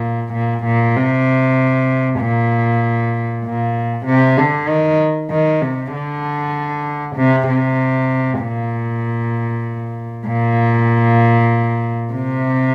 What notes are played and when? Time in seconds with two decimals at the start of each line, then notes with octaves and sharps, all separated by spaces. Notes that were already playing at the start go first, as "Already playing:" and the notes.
Already playing: A#2
0.33 A#2
0.65 A#2
0.96 C3
2.20 A#2
3.44 A#2
4.06 C3
4.37 D3
4.68 D#3
5.30 D#3
5.61 C3
5.93 D3
7.16 C3
7.47 C3
8.41 A#2
10.27 A#2
12.13 C3